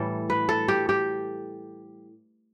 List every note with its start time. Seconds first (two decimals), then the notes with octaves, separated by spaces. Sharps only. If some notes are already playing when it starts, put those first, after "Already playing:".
Already playing: A2 E3 G3 A4
0.30 B4
0.49 A4
0.68 G4
0.89 G4